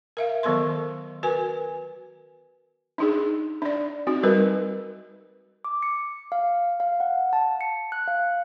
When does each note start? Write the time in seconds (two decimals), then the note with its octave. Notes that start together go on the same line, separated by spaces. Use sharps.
0.17 A#4 E5 F5
0.43 D#3 F#3 B3 A4 A#4 C6
1.23 F#4 A#4 B4 G#5
2.98 D4 D#4 G#4
3.62 D4 D5
4.07 C4 D#4 F#4
4.23 G3 A#4 B4
5.65 D6
5.83 C#7
6.32 F5
6.80 F5
7.00 F#5
7.33 A5
7.61 C#7
7.92 F#6
8.08 F5